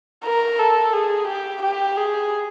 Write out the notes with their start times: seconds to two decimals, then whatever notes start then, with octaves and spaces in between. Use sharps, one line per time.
0.25 A#4
0.59 A4
0.93 G#4
1.27 G4
1.63 G4
1.97 G#4